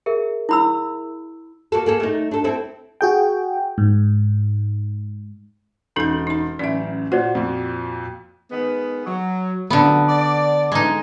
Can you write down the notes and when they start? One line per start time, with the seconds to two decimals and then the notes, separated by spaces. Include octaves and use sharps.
0.06 G#4 A#4 E5
0.49 E4 B5 E6
1.72 A#3 F#4 A4
1.86 A#3 G#4 A4
2.00 A3 D#4
2.31 D4 A4
2.44 C4 E4 A4
3.01 F#4 G#4 G5
3.78 G#2
5.96 E1 C#4 D#4 A4 G6
6.27 D#4 B5
6.59 A1 F#2 D5 E5
7.12 A#2 F#4 C5 D5 F#5
7.35 F2 A#2
8.51 D#3 G#3 B3
9.06 F#3
9.70 A2 D3 F3 F#3 B3
10.08 D5
10.72 D3 E3 G#3 D#4